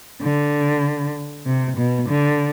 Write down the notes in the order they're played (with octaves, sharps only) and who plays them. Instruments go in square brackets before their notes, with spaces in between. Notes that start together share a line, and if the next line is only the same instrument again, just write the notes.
[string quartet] D3
C3
B2
D3